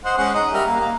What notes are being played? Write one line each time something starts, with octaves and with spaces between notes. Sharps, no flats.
C5 D#5 F#5
G#3 C#4 F#5
D#4 D#5
G3 A#4 E5
A#3
A#3